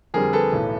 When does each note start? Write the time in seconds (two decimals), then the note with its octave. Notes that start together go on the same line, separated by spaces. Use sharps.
0.14 F2 D3 G3 C4 G#4 A#4
0.33 A4 B4
0.53 B1 A2 E3